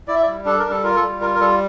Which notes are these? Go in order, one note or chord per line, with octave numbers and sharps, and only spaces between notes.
E4 D5
E5
D5
G3
D4 A4
A#4
G3
A4
F4 A#4
A4
G3
F4 A#4
A#4
G3 A4